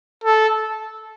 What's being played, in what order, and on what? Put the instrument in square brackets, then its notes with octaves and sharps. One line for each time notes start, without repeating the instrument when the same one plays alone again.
[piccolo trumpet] A4